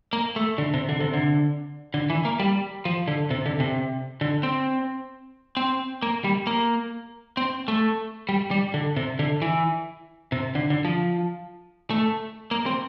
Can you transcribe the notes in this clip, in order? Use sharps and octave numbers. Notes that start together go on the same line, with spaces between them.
A#3
A3
D3
C3
D3
C3
D3
D3
E3
A#3
G3
F3
D3
C3
D3
C3
D3
C4
C4
A#3
G3
A#3
C4
A3
G3
G3
D3
C3
D3
E3
C3
D3
D3
F3
A3
A#3
C4